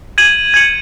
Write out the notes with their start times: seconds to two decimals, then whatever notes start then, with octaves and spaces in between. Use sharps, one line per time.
0.18 G#6 D#7 F#7
0.54 G#6 C#7 F#7